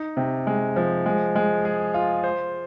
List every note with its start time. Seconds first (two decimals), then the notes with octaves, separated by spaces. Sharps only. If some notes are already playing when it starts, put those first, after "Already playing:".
Already playing: D#4
0.17 C3
0.47 G#3
0.76 F3
1.06 G#3
1.36 G#3
1.65 G#4
1.94 F4
2.24 C5